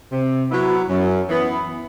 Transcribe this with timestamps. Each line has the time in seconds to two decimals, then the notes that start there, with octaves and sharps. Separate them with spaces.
0.12 C3
0.51 F#3 B3 E4
0.89 F#2
1.29 E3 B3